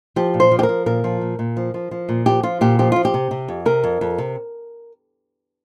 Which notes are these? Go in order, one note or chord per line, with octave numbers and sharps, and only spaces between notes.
F3 G4
A#2
C5
F3
G4
A#4
F3
A#2 A#4
F3
A#2
A#2
F3
F3
F3
A#2
F3 G4
F3 F4
A#2 G4
F3 G4
F3 F4
G4
C3
C3
F2
C3 A#4
F2
F2
C3